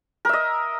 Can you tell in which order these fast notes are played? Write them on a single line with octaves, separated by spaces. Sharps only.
A#4 E5 D#5